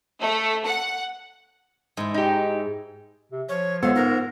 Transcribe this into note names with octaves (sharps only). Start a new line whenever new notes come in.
A3
F#5
G#2 E4
D#4 G4
C3
F3 C#5
D3 G#3 B3 F4 C5
G#2 A#4